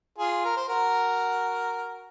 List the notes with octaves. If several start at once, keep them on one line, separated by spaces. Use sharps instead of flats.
F4 G#4
A#4
C5
F#4 A#4